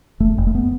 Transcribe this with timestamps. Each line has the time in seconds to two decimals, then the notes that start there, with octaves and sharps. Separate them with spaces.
0.20 F1 A3
0.37 F1
0.47 A3
0.55 B3